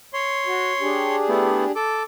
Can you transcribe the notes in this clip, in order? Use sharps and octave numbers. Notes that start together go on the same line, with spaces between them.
C#5 C6
F#4
D4 G4 G#4
A3 B3 E4
A4 D6